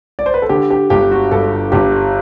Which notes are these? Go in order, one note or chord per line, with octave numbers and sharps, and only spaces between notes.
D5
C5
B4
A4
D3 G4
G4
G1 G4
F#4
G2 A4
G1 G4